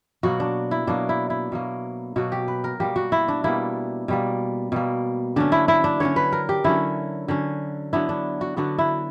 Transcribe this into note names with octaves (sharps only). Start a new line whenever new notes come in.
B2 F#3 A#3 F#4
D4
E4
B2 F#3 A#3 D4
E4
E4
B2 F#3 A#3
B2 F#3 A#3 F#4
G4
B4
A#4
B2 G3 A#3 G4
F#4
E4
D4
B2 G3 A#3 E4
B2 G3 A#3
B2 G3 A#3
D3 F#3 C#4 D4
E4
E4
D4
D3 F#3 C#4 C#5
B4
A#4
G4
D3 F#3 C#4 E4
D3 F#3 C#4
D3 F#3 B3 D4 E4
D4
F#4
D3 F#3 B3 D4 F#4
E4